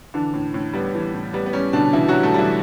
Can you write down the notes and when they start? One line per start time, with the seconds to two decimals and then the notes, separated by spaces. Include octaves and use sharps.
0.14 D3 E3 D4
0.34 A2
0.54 A2
0.73 G3 B3
0.94 E3
1.14 A2
1.34 G3 B3
1.46 B3
1.53 G3 C#4
1.73 B2 D3 D4
1.93 B2 E3 E4
2.08 F#3 G3 F#4
2.23 A3 A4
2.34 E3 G3 E4